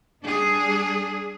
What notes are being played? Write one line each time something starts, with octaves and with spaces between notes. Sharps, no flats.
G3 D4 G#4